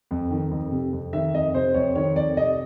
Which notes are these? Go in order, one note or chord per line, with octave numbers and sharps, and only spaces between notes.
F2
D#3
F2
C3
F2
D#3 E5
F2 D#5
C3 C5
F2 C#5
D#3 C#5
F2 D5
C3 D#5